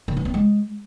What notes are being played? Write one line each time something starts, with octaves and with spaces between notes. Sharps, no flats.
D#3
E3
C4
G#3